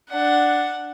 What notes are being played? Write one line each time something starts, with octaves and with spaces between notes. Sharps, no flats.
D4 F#5